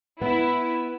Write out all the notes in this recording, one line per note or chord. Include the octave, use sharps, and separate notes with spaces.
B3 E4 B4